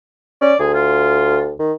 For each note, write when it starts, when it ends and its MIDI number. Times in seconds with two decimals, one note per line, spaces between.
0.41 0.54 61
0.41 0.57 74
0.60 1.54 38
0.60 0.72 68
0.74 1.41 65
1.60 1.73 51